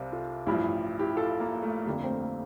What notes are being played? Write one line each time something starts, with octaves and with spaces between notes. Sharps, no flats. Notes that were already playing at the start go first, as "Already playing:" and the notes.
Already playing: C2 C3 G3 A#4 C5 D5 F5
F4 A4
A1 G2 F3 E4 G4
E4 G4
F4 A4
A#3
A3
G1 F2 D3 G3 A#3
A3 C4
A#3